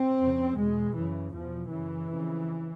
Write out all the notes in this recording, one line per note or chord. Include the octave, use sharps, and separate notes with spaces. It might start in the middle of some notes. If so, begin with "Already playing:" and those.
Already playing: C4
F2 C#3
E2 B2 G#3
F#2 C#3 E3
E2 B2 F3
F#2 C#3 E3
F2 C#3